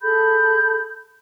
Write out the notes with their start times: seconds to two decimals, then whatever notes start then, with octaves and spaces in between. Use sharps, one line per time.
0.02 G#4 A4 B5 G6